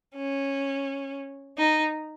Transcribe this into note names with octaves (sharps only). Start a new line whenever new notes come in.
C#4
D#4